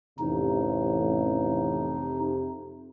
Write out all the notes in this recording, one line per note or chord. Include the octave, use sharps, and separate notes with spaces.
A1 F2 C3 D#4